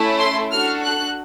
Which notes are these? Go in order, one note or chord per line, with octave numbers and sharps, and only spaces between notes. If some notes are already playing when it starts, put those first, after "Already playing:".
Already playing: A3 C#4 E4
C6
D4 F#4 A4 F6
F#6